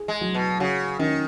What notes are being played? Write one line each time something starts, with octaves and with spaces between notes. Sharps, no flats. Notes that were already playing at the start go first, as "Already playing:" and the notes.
Already playing: G#4
G#3
F#3
B2
C#3 F#4
D#3 C#4